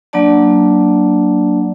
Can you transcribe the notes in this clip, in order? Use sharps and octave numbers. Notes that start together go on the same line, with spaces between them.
F#3 A#3 D4 D5 A5